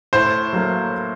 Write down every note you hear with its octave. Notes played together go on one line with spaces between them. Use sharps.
A2 C5
F#3 A#3